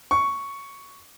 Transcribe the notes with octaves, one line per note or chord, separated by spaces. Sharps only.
C#6